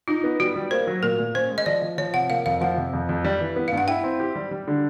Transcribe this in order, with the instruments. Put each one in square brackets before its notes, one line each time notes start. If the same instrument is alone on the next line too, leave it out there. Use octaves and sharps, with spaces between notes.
[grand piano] D#4 [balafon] F4
[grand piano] B3
[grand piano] G3 [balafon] F#4
[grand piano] G3
[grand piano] A#3 [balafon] C5
[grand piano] F#3
[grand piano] A#2 [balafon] A#4
[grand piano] A#2
[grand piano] C#4 [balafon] C5
[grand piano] G#3
[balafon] D#5
[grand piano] F3 [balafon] D5
[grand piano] F3
[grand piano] F3 [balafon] C#5
[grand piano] C3 [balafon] F#5
[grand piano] A#3 [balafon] F5
[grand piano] F2 [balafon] F5
[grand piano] F3 [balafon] F#5
[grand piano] C3
F2
F2
G3
E3
B3
[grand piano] G2 [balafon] F5
[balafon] F#5
[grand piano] E4 [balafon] G5
[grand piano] C4
G4
G3
G3
D3